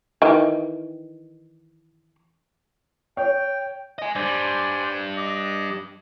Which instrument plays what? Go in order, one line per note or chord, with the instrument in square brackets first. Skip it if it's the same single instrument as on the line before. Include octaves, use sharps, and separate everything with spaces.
[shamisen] D#3 E3
[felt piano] C#5 [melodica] G5
[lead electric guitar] D#5 G#5
[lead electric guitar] G2 G3 [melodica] C5 D5 G#5
[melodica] D#5 D6